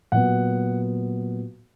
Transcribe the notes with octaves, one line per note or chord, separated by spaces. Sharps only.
A#2 F#3 B3 F#5